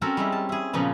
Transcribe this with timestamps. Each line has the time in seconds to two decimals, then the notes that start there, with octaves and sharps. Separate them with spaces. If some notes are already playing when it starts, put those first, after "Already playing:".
0.01 C4 C#4 F#4 A4 A#4 G5
0.17 G3 G#3 E4
0.32 A5
0.49 E4 G#4
0.73 A#2 C#3 F3 A#3 B3